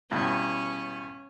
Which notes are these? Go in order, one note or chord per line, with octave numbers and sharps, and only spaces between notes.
E2 G2 B2 C#4